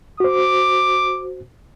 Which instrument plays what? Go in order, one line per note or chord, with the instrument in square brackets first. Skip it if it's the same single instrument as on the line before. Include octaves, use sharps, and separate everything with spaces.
[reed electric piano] F#4 C5 [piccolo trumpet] D6